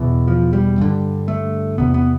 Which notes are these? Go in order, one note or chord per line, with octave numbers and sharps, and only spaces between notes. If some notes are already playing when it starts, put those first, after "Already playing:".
Already playing: E2 B2 E3
F3
G3
G2 D3
A3
E2 C3 B3
B3